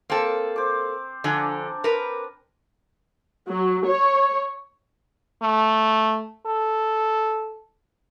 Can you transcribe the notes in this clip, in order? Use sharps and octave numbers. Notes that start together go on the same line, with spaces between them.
A#3 C4 A4
C5 D6
D3 F3 D4 G#5 A#5
A#4 B4
F#3
C#5
A3
A4